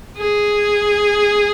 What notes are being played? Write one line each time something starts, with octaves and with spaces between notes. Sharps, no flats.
G#4